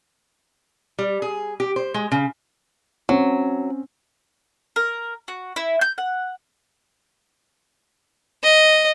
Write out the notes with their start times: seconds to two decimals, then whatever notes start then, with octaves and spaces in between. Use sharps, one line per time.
0.99 G3
1.22 G#4
1.60 G4
1.76 C5
1.94 G#3
2.12 C#3
3.09 F#3 C4 C#4
4.76 A#4
5.28 F#4
5.56 E4
5.81 G6
5.98 F#5
8.43 D#5